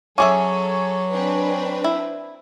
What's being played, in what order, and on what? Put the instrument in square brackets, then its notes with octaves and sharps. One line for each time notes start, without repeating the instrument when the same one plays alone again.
[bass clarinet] F#3 [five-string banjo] C#4 G#4 E5 [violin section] A4 [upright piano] G#5 C#6 D6
[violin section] C4 D4 B4
[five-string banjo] E4